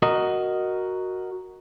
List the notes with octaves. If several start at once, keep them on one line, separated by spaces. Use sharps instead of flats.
F#4 A#4 D#5